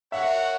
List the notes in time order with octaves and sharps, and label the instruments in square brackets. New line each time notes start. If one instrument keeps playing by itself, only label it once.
[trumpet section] F#4 A#4 C#5 F#5 [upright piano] E5